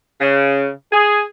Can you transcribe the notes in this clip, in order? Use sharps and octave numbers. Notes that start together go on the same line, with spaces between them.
C#3
G#4